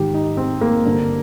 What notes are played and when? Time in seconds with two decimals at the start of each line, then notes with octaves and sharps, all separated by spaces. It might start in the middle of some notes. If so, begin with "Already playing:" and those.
Already playing: G#2 D#3 G4
0.14 D#4
0.37 C4
0.61 A#3
0.85 G2 D3